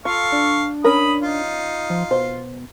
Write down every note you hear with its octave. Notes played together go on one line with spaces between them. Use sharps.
F4 A4 F5 C#6
D4
C#4 A#4 B5 D#6
D#4 F4
F3
B2 C5